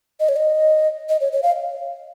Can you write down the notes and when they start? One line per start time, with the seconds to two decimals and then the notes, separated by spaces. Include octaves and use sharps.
0.20 D#5
0.29 C#5
0.36 D#5
1.09 D#5
1.21 C#5
1.33 C#5
1.43 F5